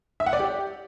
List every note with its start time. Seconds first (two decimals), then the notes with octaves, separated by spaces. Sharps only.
0.20 E5
0.26 F#5
0.33 D5
0.39 G4